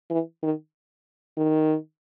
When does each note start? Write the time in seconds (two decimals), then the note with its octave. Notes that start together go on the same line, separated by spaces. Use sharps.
0.10 E3
0.43 D#3
1.37 D#3